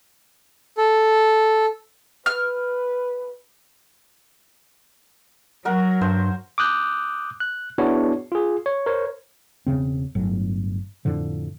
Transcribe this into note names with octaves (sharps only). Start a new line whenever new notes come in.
A4
B4 F6
F#3 A#4 F#5
G2 C5
D6 D#6 F#6 G6
F#6
B3 D4 E4 F#4 G#4 C#5
F4 G#4
C#5
A#4 C5 C#5
E1 B1 C#3 C4
G1 A2 F#3
F2 A2 D3 F3